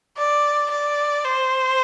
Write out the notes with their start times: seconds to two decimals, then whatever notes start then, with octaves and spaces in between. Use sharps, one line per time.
0.17 D5
0.70 D5
1.24 C5